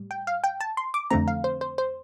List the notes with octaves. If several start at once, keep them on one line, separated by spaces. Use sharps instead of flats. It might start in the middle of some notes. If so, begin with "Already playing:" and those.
Already playing: A2 G3
G5
F5
G5
A5
C6
D6
F2 D3 A3 C4 A#5
F5
C5
C5
C5